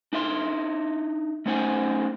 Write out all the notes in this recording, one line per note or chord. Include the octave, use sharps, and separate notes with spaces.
D4 D#4 E5 C6
A3 C#4 D#4 C5 F#5 G#5